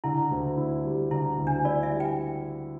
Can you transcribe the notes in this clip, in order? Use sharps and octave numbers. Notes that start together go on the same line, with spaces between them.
D3 E4
D2
E4
G3
D3 E4
D2
D4
E4 D5
E5
G3
G5